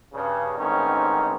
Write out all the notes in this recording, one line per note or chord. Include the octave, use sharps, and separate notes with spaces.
G2 C#3
A1 G#2 D#3 C4 C#4 D#4